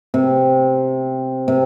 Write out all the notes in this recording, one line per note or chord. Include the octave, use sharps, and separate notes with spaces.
C3
C3